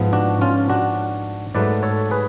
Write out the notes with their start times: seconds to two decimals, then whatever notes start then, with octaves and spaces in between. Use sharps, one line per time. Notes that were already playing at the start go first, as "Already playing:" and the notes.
Already playing: G#2 F3 B3
0.13 D4 F#4
0.41 C#4 F4
0.69 D4 F#4
1.55 G#2 F#3 A3 B4 D5
1.83 A4 C#5
2.11 G#4 B4